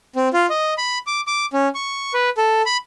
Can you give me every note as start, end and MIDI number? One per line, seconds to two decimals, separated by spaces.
0.16 0.28 60
0.33 0.46 65
0.50 0.74 75
0.78 0.98 83
1.07 1.21 86
1.27 1.46 86
1.53 1.69 61
1.75 2.13 85
2.14 2.30 71
2.37 2.62 69
2.66 2.77 83